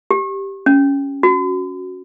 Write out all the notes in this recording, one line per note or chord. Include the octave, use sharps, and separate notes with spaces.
G4
C#4
F#4